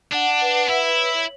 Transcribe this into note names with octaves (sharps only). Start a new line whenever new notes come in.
D4 F#5
B4
E4 E5
C#5